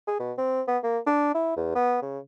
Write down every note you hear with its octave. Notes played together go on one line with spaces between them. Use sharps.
G#4
B2
C4
B3
A#3
D4
E4
E2
B3
C#3